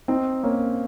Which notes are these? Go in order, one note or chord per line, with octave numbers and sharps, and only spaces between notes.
C4 D#4
A#3 C#4